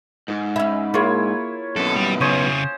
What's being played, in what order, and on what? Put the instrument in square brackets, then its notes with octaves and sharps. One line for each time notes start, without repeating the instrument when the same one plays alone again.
[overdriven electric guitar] G#2
[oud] C#4 E5 [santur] B5
[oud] A#3 G#4 [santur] E4 F4 C#5
[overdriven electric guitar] F#2 B2 [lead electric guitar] A4
[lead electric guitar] G3
[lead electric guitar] C#3 E4 [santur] C#4 C5 D#6